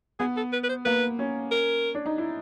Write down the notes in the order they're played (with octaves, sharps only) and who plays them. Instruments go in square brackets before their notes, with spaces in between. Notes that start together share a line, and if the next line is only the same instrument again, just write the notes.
[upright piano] B3 [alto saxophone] G#4
[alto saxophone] A4
B4
B4
C5
[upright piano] A#3 [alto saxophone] B4
[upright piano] C#4
[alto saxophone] A#4
[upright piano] D4
D#4
E4